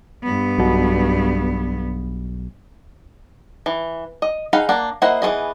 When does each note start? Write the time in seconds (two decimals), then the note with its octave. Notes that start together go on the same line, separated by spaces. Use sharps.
0.23 G2 B3
0.58 B1 B2
3.66 E3
4.22 D#5
4.53 D#4 G#4 F5 F#5 B5
4.69 A#3 D4 F#5
5.02 A#3 E4 C5 D#5 F#5
5.22 E3 B3 C4 G#4 D#5